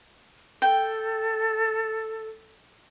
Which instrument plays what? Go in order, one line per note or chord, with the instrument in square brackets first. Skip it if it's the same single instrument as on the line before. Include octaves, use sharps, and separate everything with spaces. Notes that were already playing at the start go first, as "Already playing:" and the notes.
[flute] A4 [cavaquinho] G5